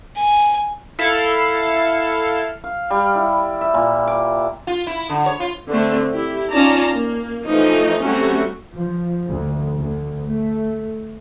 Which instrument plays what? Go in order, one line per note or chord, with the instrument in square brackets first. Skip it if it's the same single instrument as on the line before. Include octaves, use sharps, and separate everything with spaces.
[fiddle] G#5
[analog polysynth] E4 A4 F5 E7
[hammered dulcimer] F5
G3
E4
E5
A#2
D6
[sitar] F4
E4
D3
C#5
F4
[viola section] D3 A3 C4
E4 G4
C#4 D#4 F4 D5 A5 A#5
A#3
E3 F3 A3 D#4
F#3 G3 A3 C4 C#4 F#4
[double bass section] F3
D2
D2
A3